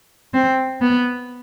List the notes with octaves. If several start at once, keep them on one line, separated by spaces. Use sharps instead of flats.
C4
B3